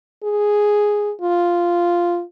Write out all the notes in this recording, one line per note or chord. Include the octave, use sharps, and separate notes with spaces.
G#4
F4